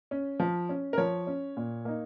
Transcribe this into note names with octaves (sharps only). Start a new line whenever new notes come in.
C#4
F3
C#4
A#4
F3 C#5
C#4
A#2
A#3 D#4